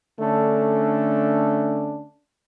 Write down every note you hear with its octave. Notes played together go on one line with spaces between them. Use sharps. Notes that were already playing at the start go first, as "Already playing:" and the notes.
D3 A3 C#4 D4